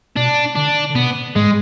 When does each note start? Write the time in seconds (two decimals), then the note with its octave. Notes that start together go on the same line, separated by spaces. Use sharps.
0.16 B2 D4
0.56 D3 D4
0.90 D3
0.95 B2 B3
1.35 G#2 G#3